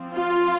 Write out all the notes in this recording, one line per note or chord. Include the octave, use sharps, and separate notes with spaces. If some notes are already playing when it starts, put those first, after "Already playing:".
Already playing: F3 C4
F4